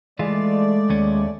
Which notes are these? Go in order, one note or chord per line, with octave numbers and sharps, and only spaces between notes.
E3 G#3 A3 F4 D5
D#2 C#4